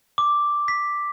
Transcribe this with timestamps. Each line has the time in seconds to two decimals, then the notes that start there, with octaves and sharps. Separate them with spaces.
0.18 D6
0.68 B6